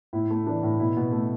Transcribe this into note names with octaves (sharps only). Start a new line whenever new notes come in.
A2 E4
A3
E3 D4
A2
B2 E4
B2
A3